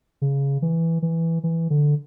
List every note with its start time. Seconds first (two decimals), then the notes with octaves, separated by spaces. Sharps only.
0.22 C#3
0.62 E3
1.02 E3
1.44 E3
1.70 D3